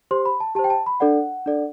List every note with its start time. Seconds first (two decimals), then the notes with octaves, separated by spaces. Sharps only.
0.11 G4 C5 C6
0.26 B5
0.40 A5
0.55 G4 C5 A5
0.64 G5
0.70 A5
0.86 B5
1.00 D4 A4 D5 F#5
1.46 D4 A4 D5